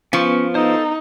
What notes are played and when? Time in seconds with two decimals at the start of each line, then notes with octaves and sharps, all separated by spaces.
0.13 F3 B3 C#4 B4 F5 C#6
0.55 D#4 A4 C5